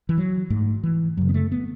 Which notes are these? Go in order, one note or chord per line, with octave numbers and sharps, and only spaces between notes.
E3
F#3
G#2 A3
E3
F#2 C#3 F#3
B3
A3
B3